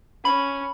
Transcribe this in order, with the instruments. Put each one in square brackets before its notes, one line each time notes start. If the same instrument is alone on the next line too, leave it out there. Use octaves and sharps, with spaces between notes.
[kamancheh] C#4 [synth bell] B5